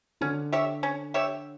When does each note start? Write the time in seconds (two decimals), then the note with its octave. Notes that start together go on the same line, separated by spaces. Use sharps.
0.21 D3 C#4
0.53 G4 C#5 E5
0.83 C#4
1.14 G4 C#5 E5